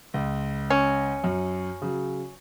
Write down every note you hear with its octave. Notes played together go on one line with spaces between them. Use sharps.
C#2
C#4
F#2
C#3 F#3